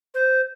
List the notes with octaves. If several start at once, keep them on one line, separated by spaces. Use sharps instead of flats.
C5